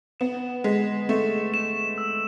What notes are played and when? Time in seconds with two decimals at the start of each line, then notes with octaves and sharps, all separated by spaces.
0.20 B3 E7
0.64 G#3 B6
1.09 A3 E7
1.54 E7
1.98 E6